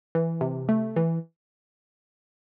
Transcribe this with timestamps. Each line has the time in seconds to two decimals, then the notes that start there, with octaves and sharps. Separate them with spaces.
0.15 E3
0.41 C3
0.69 A3
0.96 E3